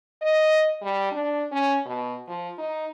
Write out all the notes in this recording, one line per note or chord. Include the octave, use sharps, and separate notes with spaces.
D#5
G3
D4
C#4
B2
F3
D#4